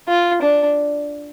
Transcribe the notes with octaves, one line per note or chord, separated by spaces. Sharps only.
F4
D4